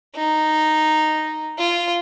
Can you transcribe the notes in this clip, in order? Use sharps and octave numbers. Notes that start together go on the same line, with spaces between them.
D#4
F4